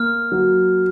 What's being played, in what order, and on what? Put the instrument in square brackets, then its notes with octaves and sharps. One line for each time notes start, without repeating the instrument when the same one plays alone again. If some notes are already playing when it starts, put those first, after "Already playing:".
Already playing: [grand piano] A#3 [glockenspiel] F6
[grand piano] F#3